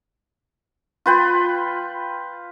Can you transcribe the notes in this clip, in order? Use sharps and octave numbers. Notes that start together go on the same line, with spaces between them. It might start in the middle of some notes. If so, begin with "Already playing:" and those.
F4 B4 G5